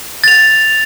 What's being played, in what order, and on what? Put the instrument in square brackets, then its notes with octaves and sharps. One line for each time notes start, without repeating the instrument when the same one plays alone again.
[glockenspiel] A6 F7